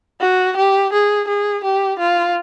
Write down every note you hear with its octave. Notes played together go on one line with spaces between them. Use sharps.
F#4
G4
G#4
G#4
G4
F4